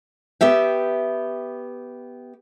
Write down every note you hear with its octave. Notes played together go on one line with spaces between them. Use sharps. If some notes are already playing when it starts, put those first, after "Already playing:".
B3 G4 E5 G5